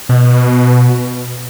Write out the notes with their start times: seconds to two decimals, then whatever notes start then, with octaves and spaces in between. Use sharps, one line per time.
0.09 B2